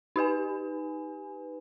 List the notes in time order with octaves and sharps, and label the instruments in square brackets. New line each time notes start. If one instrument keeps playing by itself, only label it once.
[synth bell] D#4 G4 B4 G#5